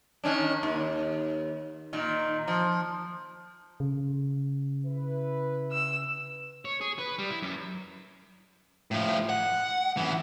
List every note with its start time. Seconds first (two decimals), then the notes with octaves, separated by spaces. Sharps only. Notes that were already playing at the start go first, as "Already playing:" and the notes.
0.24 D#3 C#4 D4
0.63 D#2
1.93 A#2 D#3
2.48 F3
3.80 C#3
4.85 E4 B4
5.72 E6
6.65 C#5
6.81 G#4
6.99 B4
7.19 G3
7.30 E4
7.42 F#2
8.91 A2 F3
9.30 F#5
9.97 F#2 E3